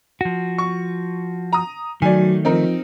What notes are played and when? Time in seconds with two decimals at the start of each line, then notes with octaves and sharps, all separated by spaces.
0.21 F3 F#4
0.58 C#6
1.53 A#5 D#6
2.02 D#3 F#3 A3 D5 G#5
2.45 F3 C4 D#4 A#4